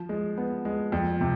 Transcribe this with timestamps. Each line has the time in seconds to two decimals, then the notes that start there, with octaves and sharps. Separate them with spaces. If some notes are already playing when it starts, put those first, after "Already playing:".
Already playing: F3
0.09 G#3
0.38 B3
0.65 G#3
0.92 F2
1.21 C3